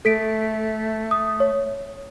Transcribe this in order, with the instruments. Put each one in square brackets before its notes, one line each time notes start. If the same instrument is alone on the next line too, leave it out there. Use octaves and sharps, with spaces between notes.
[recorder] A3 [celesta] A4 B6 D7
[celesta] D#6
C#5